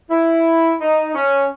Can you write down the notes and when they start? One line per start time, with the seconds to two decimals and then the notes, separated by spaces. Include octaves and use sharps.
0.11 E4
0.81 D#4
1.15 C#4